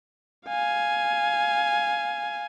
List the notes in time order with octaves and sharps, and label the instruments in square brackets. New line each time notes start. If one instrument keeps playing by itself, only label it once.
[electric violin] F5 G#5